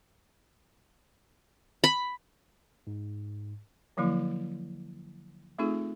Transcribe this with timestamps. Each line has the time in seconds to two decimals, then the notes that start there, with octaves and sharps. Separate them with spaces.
1.84 B5
2.87 G#2
3.97 D3 F3 F#3 A#3 E4
5.59 A3 C4 D#4 F4 G#4 A4